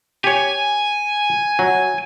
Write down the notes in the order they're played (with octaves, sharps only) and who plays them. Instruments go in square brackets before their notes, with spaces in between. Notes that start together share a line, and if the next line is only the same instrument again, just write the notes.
[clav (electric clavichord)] G4 C#5 [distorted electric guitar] G#5
[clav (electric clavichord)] F#3